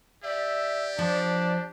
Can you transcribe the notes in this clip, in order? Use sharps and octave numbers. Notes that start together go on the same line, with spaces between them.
G4 D5 E5
F3 D4